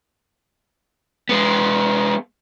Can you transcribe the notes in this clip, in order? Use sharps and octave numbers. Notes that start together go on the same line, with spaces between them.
G#3 B3